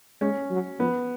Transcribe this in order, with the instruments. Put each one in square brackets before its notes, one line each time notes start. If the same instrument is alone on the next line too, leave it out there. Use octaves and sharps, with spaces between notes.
[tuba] G#3 [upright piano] C#4
[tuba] F#3
[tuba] F3 [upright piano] B3